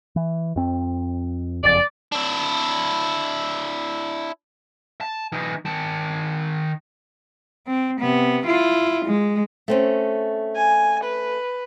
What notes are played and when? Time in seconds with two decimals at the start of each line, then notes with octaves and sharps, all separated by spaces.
0.16 E3
0.56 F2 C4
1.63 F#1 F2 D5
2.12 D4 E4
5.01 A5
5.32 E3 D#4
5.65 D#3 A5
7.67 C4
8.00 C3 B3
8.46 E4 F4
9.05 G#3
9.68 A3 C4 C#4
10.56 G#5
11.04 B4